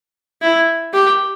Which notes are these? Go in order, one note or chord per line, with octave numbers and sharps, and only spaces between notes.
E4
G4